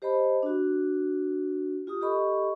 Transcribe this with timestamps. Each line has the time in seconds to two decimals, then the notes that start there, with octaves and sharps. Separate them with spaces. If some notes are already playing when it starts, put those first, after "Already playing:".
0.02 G4 C5 D#5 A5 B5
0.43 D4 F#4
1.87 F4 G4 D#6
2.01 G4 A4 D#5 B5 C#6